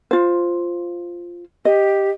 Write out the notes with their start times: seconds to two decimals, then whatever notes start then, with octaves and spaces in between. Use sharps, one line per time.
0.11 F4 C5
1.65 G4 D#5